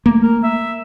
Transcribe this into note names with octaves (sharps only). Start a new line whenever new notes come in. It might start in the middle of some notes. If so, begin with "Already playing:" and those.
A3 A#3
A#4
E5